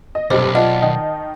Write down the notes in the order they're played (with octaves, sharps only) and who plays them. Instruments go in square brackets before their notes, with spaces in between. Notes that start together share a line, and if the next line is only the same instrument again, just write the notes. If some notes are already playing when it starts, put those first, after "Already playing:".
[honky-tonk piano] D#5
[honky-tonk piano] F1 G2 [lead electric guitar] B1 [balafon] C5 [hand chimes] D6
[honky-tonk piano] F4 [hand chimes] D5 F#5 A5 [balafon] D#5
[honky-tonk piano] D#3 D#4 [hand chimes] A5